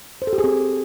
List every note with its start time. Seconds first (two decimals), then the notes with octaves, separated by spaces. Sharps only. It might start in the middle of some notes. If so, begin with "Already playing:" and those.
0.22 C5
0.27 A4
0.33 G4
0.38 G#4
0.44 C4